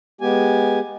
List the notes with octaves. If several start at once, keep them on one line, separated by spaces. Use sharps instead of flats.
G#3 B3 G4 G#5